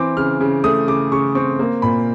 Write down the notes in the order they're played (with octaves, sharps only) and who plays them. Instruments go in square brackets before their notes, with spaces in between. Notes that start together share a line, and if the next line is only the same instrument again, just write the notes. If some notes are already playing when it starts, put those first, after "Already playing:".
Already playing: [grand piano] E3 C4 D6
C#3 F6
C#3
A3 D#6
C#3 D6
C#3 C#6
C4 C#6
A#3
A#2 B5